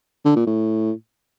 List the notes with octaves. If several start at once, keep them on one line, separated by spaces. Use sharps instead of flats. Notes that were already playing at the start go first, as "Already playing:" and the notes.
D3
A#2
A2